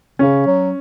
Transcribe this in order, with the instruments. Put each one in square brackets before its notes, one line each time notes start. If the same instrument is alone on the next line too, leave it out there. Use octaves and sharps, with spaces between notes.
[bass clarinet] C#3 [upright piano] C#4
[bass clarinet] F#3